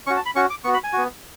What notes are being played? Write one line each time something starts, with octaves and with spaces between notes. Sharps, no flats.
C#4 F#4 C#6
A5
B5
C#4 F#4 C#6
D6
B3 F#4 C#6
B5
G#5
B3 F#4